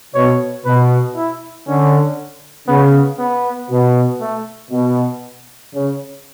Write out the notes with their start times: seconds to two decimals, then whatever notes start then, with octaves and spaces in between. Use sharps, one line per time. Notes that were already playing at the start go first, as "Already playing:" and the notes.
0.15 B2 C#5
0.65 B2 B4
1.16 E4
1.67 D3 C#4
2.68 C#3 B3
3.18 B3
3.70 B2
4.20 A3
4.71 B2
5.73 C#3